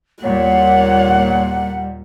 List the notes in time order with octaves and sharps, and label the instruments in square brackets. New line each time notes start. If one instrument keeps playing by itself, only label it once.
[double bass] D#2 G3 [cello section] A#2 [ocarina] C#5 [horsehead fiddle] F#5